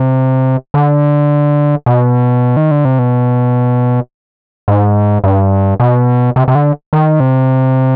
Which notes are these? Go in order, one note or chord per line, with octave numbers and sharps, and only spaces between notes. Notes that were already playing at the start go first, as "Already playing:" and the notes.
Already playing: C3
D3
B2
D#3
D3
C3
B2
G#2
G2
B2
C3
C3
D3
D#3
C3